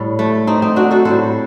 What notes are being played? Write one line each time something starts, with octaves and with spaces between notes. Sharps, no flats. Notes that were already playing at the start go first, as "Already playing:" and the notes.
Already playing: A2 G3
A3
C4 D#4
C4 D#4
D4 F#4
F#4 A4
A2 G3 A4 C5